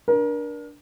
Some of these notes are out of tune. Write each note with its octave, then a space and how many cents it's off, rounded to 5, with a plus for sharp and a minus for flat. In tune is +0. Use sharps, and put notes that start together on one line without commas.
D4 +0 A#4 +30